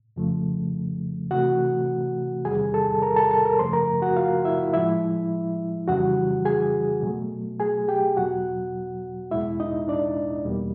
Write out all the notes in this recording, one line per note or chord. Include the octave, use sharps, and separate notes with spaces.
F2 C#3 F3 A3
C3 E3 A3 F#4 F#5
E2 C3 D#3 G3 G#4 G#5
A4 A5
A#4 A#5
A4 A5
A4 A5
A#4 A#5
F#2 C#3 F3 A3 C5 C6
A#4 A#5
F#4 F#5
F4 F5
E4 E5
A2 F3 G#3 E4 E5
F2 C#3 E3 G3 F#4 F#5
G#4 G#5
B2 F#3 A3
G#4 G#5
G4 G5
E2 B2 F#3 F#4 F#5
E2 B2 G#3 E4 E5
D#4 D#5
D4 D5
E2 B2 G3 A#3